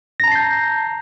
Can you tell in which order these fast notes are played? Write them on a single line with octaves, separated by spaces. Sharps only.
A#6 A#5 A5 C7 G6